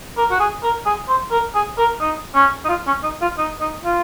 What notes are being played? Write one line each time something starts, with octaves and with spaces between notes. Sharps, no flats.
A#4
F#4
G#4
A#4
G#4
C5
A#4
G#4
A#4
D#4
C#4
D#4
F4
C#4
D#4
F4
D#4
D#4
F4